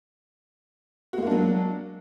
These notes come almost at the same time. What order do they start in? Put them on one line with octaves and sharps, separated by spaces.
F#4 G#3 A#3 D4 F#3